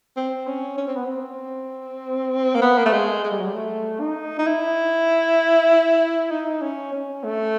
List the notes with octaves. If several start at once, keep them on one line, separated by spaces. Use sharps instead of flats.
C4
C#4
C#4
C4
B3
C4
A#3
B3
A#3
A3
G#3
G#3
G3
F#3
G3
A3
D#4
D#4
E4
D#4
C#4
C#4
A3